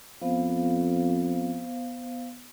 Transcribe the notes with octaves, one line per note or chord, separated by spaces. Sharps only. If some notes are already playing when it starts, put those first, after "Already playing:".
F2 B3 C5 F5